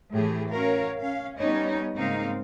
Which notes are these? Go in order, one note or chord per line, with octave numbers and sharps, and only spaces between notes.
A2 E3 A3 G4 G#4
C#4 F#4 A#4 C#5 F5
C#4 F5
G3 B3 C#4 D#4 C#5 D#5
G#2 C#3 A#3 C4 D#4 F5